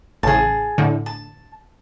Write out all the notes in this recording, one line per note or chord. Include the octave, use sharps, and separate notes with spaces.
A1 C#3 G#4 A5
A2 D3
A5